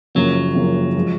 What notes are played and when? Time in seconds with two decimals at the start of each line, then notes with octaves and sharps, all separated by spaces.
0.15 F#1 F#2 F3 F#3 A#3 C#4
0.55 F#1 F#2 F3 A#3 C#4
0.97 F3 G#3